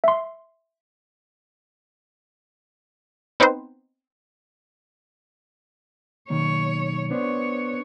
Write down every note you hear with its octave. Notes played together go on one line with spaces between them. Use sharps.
E5 C6
B3 C4 D#4 B4 C5
B1 D#3 A#3 C#5
B3 D4 C5 C#5